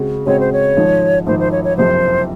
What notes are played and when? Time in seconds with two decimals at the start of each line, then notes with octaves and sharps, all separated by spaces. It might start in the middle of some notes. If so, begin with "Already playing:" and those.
Already playing: C#3 G#3 C4 F#4
0.26 C#3 G#3 C4 F#4 C#5
0.40 C5
0.53 C#5
0.77 G#1 G#2 F3
1.27 G#1 G#2 F3 C5
1.39 C5
1.52 C#5
1.64 C#5
1.77 F#1 F2 C3 F3 C5